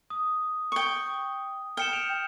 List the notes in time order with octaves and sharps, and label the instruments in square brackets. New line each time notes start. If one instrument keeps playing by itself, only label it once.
[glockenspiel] D#6
[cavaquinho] G5 C#6
[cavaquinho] G5 [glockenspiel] F6 C#7 E7
[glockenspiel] G6 D7 F7